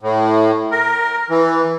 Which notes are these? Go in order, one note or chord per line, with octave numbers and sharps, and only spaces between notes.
A2
A#4
E3